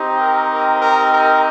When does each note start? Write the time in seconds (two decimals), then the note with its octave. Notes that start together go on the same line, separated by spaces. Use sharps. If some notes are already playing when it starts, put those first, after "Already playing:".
Already playing: C4 D#4 G4
0.19 A#4
0.50 A#4
0.80 A#4
1.11 A#4